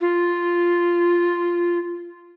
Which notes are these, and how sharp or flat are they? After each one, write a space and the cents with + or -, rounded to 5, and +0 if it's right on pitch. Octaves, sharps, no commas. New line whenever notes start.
F4 -5